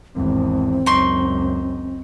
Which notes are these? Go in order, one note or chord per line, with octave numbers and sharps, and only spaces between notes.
G#1 E2 C4
C#2 F#2 D#4 C6 C#6